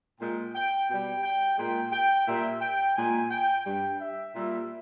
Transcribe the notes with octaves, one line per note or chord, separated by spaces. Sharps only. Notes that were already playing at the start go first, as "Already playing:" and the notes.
A#2 G#3 G5
G5
B2 G3 G5
G5
A#2 G#3 G5
G5
A#2 G3 E5
G5
A#2 G#3 G#5
G5
G2 G3 G5
E5
A#2 G3